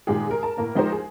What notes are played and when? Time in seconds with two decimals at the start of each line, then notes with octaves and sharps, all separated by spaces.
0.07 A#2 D#3 G#3 G4 G#4
0.27 G#4 A#4
0.43 A#4 A5
0.57 A2 A#3 A#4
0.75 F3 G#3 D#4 G4 A#4 C5
0.92 G#4